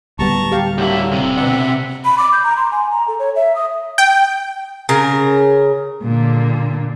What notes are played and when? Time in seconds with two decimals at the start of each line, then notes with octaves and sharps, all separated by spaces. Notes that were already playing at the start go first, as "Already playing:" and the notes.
0.19 D1 G3 B3 A5 A#5 C#6
0.52 G4 F5
0.78 D2 D3 F#3 A#3 E4 G4
1.11 B1 C3
1.37 B2 D3 E5 F#5
2.05 B5
2.18 D6
2.32 G6
2.44 A#5
2.56 C6
2.71 G#5
2.91 A#5
3.08 A4
3.19 C#5
3.36 E5
3.56 D#6
3.98 G5
4.89 C#3 A#4
6.03 A#2 D3